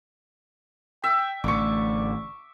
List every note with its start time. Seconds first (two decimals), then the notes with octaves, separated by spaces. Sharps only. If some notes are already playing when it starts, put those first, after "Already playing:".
1.04 E5 G5
1.44 A1 A2 D3 D5 C#6 D6